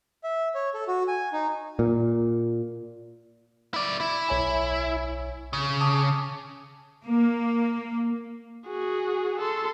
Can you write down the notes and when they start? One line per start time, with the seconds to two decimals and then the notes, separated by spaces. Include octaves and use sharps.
0.23 E5
0.55 C#5
0.74 A4
0.87 F#4
1.08 G#5
1.32 D#4
1.79 A#2
3.74 E4 D5
4.00 E4
4.29 B1 C#5 G#5
5.53 C#3
5.81 A5 D6 D#6
7.04 A#3
8.67 F#4 G#4
9.39 A4 C6